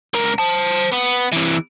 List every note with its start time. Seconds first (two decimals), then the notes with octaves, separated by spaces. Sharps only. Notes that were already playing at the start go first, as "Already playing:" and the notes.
0.14 C#2 A#4
0.39 C5 A5
0.92 B3
1.32 C3 E3